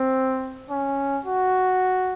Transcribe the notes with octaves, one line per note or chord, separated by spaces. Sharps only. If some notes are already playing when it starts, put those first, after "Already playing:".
Already playing: C4
C#4
F#4